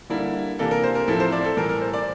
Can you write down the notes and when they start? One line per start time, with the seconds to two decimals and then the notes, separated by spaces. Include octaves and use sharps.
0.09 D3 G3 A#3 E4
0.59 C3 E3 A#3 D4 A4
0.71 A#4
0.84 C5
0.95 A#4
1.08 A2 F3 C4 E4 A4
1.20 C5
1.32 D5
1.44 A4
1.57 A2 E3 G3 A#4
1.69 A#4
1.81 C5
1.94 D5